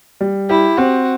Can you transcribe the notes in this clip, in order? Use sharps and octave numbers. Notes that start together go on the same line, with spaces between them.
G3
E4 G4
C4 F#4